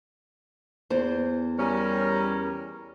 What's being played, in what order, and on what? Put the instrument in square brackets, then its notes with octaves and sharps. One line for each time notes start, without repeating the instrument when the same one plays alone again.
[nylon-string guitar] E2 C5
[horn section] G3 C#4 A#4